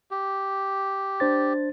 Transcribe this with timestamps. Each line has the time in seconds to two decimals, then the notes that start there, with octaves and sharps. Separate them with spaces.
0.11 G4
1.20 D4 C5 A6